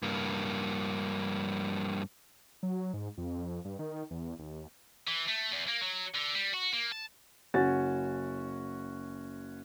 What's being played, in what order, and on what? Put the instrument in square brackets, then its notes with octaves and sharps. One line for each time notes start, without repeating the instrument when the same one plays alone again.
[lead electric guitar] G2 A#3
[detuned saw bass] F#3
G#2
F2
G2
D#3
E2
D#2
[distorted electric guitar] E3
A3
E2
A#3
F#3
D3
G3
F#4
A#3
A5
[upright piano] F#1 C#4 F#4 A6